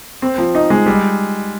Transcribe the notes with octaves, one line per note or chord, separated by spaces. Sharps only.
C4
F3
D#4
G#3
G3